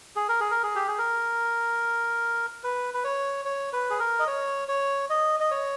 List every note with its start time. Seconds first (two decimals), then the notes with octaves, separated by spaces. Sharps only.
0.16 G#4
0.29 A#4
0.40 G#4
0.51 A#4
0.63 G#4
0.76 G4
0.88 G#4
0.98 A#4
2.64 B4
2.94 B4
3.04 C#5
3.45 C#5
3.73 B4
3.90 G#4
3.99 A#4
4.19 D#5
4.27 C#5
4.69 C#5
5.10 D#5
5.40 D#5
5.51 C#5